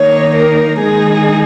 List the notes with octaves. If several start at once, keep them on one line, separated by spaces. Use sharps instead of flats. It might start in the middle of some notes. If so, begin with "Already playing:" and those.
Already playing: D#3 A#3 D#4 C#5
A#4
D#3 G#3 D#4 G#4